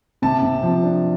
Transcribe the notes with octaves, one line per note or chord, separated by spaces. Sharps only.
C3 A5
C3
F3
D4